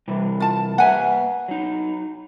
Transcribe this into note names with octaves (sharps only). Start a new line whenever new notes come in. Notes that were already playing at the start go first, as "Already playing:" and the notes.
C3 E3 G3
F4 A5
A#3 B4 E5 F#5 G#5
F#3 D#4